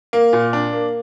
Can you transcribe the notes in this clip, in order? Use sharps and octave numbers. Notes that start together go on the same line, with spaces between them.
A#3
A#2
D4
A#3